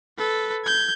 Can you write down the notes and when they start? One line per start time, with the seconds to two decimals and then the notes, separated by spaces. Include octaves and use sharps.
0.18 A4 B4
0.64 G6 G#6